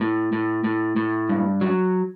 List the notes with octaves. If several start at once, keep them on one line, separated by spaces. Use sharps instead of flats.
A2
A2
A2
A2
G2
F#3